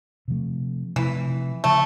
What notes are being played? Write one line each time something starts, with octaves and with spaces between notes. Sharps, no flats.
C3 F3 A3
C3 E3 F3 A3
C#3 F3 A3